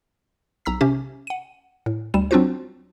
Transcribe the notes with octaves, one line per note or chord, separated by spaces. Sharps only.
B1 A#5 E6 B6
C3 C#4 G4
F#5 D#7
A2
D2 G3 E7
F#3 C4 D4 F4 F#4 C5